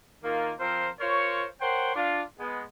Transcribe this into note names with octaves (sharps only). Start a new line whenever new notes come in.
D#3 A#3 F4
F3 C4 F4 A#4 C5
F4 A#4 C5 C#5
A#4 C5 C#5 F#5 G5 C6
D4 F4
G#3 B3